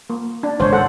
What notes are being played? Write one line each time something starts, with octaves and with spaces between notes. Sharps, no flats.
A#3
D4
G#1 C#2 G#2 C5 C#5
A4 C5 F#5